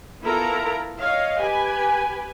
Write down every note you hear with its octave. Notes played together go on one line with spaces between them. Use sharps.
B3 E4 F4 A4 A#4 A#5
C#5 D#5 F5
G4 B4 G#5